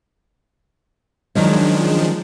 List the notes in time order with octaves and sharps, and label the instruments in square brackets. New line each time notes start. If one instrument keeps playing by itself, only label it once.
[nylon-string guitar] D#3 F#3 C#4 [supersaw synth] F3 G#3 D4